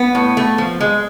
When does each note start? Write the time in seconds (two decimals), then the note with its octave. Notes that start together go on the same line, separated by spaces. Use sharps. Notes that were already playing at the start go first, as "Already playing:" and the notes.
Already playing: B3
0.15 A2
0.37 A3
0.58 F3
0.81 G#3